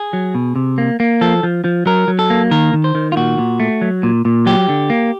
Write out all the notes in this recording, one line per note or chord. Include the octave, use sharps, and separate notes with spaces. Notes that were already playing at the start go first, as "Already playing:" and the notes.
Already playing: G#4
F#3
B2
C3
A#3
A#3
F3 A4
F3
F3
F#3 A#4
F#3
A4
A#3
D#3 A#4
D#3
C5
D#3
F4
A#2 F#4
A#2
A3
F#3
A#2
A#2
F#3 G4
D3
A#3